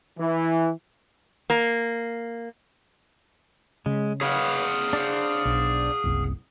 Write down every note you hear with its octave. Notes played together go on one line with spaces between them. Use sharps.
E3
A#3
C#3 G#3
G#4 B4 C#5 F5 F#5
D4 C5
B1
F#1 C2